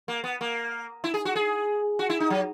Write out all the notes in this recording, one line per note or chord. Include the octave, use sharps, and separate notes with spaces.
A#3
B3
A#3
E4
G#4
F#4
G#4
F#4
E4
D#4
F#3